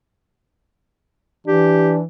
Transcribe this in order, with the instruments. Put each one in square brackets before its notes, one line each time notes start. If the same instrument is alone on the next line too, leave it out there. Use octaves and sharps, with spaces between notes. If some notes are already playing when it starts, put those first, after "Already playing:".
[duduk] E3 [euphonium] D4 [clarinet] G4